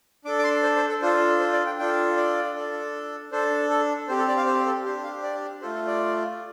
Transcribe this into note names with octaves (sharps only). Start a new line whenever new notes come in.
D4 A4 D6
D6
C6
C5
C5
A4
D4 F4 A4 C5
C5
D5
G5
D4 F4 A4 G5
D5
D4 A4
D4 A4 C5
A4
C4 G4 C5
A4
D5
F5
C5
A4
D4 G4 C5
F5
D5
A3 F4 A4 C5
A4
D5